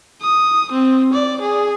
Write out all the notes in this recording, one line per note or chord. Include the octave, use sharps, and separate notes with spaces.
D#6
C4
D5
G#4